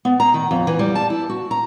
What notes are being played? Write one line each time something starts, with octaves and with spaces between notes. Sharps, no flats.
B3
A#5
D#3
F2
E3
G3
A5
E4
F#4
A#5